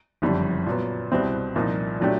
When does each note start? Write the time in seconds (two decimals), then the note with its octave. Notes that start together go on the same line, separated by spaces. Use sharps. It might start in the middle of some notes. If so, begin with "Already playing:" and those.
0.22 F#1 F2 D3 G3
0.66 A#2 F#3 B3
1.11 C2 B2 G3 C4 E4
1.55 C2 A#2 F3 A#3 D#4
2.00 A#2 F#3 A3 D4 G4